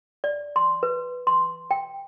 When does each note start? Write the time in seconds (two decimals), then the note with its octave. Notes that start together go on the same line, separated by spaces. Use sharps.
0.24 D5
0.56 C6
0.83 B4
1.27 C6
1.71 G5